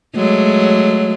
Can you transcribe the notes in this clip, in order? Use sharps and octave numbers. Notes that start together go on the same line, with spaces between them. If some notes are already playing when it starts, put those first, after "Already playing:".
F#3 G#3 A3